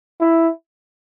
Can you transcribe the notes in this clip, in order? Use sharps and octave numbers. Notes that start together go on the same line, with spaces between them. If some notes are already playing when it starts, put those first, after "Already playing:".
E4